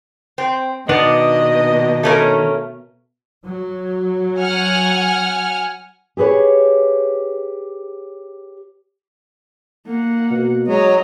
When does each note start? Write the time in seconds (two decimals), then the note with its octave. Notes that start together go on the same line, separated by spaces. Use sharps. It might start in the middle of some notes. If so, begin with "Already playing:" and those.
0.38 C4
0.89 B2 D#3 B3 D4 D5 D#5
2.03 A3 C#4 A#4
3.44 F#3
4.40 F#5 G#5 F6
6.17 G4 G#4 B4 C#5
9.87 A#3 F#5
10.30 B2
10.68 F#3 G#3 D#5 A#5